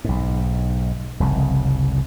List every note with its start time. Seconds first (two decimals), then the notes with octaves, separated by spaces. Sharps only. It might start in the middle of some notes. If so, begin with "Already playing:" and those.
0.04 B1 G#2
1.20 F1 C2 G#2 C#3